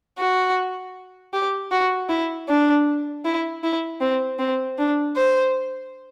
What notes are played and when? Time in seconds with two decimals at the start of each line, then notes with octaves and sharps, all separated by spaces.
0.18 F#4
1.33 G4
1.71 F#4
2.09 E4
2.48 D4
3.25 E4
3.64 E4
4.01 C4
4.39 C4
4.78 D4
5.16 C5